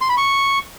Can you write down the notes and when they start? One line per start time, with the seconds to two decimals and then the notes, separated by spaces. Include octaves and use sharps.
0.01 C6
0.09 B5
0.17 C#6